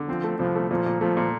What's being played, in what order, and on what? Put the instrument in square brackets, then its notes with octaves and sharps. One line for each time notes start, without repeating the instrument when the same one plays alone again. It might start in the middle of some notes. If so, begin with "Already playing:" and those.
Already playing: [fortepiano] D3
[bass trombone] F3 [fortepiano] C4
[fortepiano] A3
[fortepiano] C2 [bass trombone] F3
[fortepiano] A3
[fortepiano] A#2 [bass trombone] F3
[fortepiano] A#2
[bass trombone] F3 [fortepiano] A3
[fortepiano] A#2